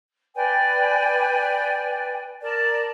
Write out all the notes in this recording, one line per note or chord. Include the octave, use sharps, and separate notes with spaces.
B4 D5 G5 G#5
A#4 D5 A5